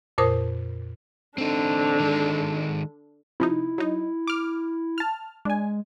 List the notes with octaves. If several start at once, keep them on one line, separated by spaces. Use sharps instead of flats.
F2 A#2 A#4 C5 D#6
D3 C4 D4 D#4
D#3 G#3
C3 F3 D#4 E4
F#3 D#4
D6 F6
A5 F6
G#3 D4 G#5